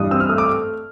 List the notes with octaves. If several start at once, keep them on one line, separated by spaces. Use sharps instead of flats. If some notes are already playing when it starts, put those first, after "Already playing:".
Already playing: G2 E3 D#6
C4 E6
F6
A3 D#6
D6